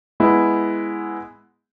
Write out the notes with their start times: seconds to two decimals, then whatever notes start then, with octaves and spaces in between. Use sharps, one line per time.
0.20 G#3 B3 E4